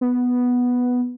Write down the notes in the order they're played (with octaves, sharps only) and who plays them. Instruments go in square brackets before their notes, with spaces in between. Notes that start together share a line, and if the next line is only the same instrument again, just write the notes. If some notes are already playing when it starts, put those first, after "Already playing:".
[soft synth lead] B3